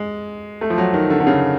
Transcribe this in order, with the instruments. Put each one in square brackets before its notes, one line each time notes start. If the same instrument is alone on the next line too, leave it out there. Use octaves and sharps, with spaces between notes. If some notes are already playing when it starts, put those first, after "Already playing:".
Already playing: [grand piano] G#3
A3
F3
F#3
D#3
D3
D3
C#3